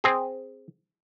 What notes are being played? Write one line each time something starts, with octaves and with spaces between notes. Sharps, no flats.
C4 G#4